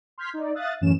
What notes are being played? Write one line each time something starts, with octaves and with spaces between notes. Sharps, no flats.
C6 F6 G6 G#6 B6
D#4 D5
E5 F5 D#6 F#6 A6
F#2 A2 E3 C#4 E7